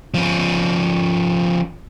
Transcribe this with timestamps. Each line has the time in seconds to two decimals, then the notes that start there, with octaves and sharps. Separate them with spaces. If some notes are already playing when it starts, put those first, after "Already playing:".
0.14 F3 C#4